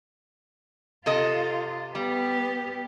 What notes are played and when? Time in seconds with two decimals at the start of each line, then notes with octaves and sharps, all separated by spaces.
1.06 C3 F4 A4 D#5
1.95 G3 B3 G4